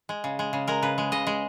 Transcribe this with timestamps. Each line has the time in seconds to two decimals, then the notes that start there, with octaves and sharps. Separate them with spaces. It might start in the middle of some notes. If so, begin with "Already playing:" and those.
0.09 G#3
0.24 C#3
0.39 G#3
0.53 C#3
0.67 G#3 A#4
0.82 C#3 B4
0.98 G#3
1.12 C#3 D#5
1.27 G#3